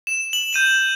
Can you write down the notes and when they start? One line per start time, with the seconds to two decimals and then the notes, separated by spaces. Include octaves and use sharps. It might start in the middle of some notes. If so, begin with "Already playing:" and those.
0.07 E7
0.33 F#7
0.53 G6 D#7 F#7